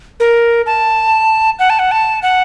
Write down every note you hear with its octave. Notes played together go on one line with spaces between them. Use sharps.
A#4
A5
F#5
A5
F#5
A5
F#5